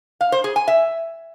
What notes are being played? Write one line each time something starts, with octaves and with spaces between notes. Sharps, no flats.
F5
C5
G#4
G#5
E5